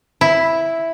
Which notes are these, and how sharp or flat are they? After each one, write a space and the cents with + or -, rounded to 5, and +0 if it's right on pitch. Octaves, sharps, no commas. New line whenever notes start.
E4 +0